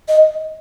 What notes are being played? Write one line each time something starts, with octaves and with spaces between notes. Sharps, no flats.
D#5